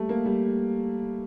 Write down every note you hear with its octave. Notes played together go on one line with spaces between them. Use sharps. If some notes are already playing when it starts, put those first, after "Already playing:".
Already playing: G3 A3
A#3
G3